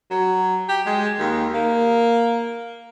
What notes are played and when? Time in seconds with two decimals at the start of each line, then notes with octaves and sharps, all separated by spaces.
0.10 F#3
0.69 G4
0.86 G#3
1.19 D#2
1.54 A#3